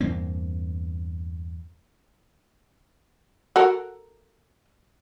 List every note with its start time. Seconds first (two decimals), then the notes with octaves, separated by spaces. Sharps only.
0.01 E2 G2 A#3 C4
3.56 F#4 A4 A#4